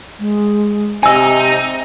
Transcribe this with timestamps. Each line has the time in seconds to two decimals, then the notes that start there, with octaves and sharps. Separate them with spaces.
0.19 G#3
1.03 C3 D#4 D#5 G#5 E6